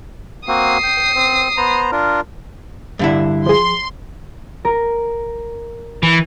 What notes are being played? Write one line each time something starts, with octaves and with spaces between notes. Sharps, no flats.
A#3 C4 F#4 D#6 C7
G5
C4
B3 C5 A#5
D4 F4 A#4
G2 D3 E4
F3 G#4 C6
A#4
E3